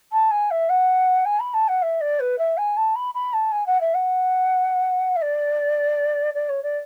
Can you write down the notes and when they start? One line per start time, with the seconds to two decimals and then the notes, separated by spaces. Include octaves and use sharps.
0.12 A5
0.31 G#5
0.50 E5
0.69 F#5
1.25 G#5
1.39 B5
1.53 A5
1.68 F#5
1.82 E5
2.00 D5
2.19 B4
2.38 E5
2.57 G#5
2.76 A5
2.95 B5
3.14 B5
3.33 A5
3.51 G#5
3.66 F#5
3.80 E5
3.94 F#5
5.16 E5
5.21 D5
6.34 D5
6.49 C#5
6.62 D5